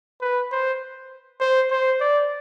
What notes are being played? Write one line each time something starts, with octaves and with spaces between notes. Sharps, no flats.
B4
C5
C5
C5
D5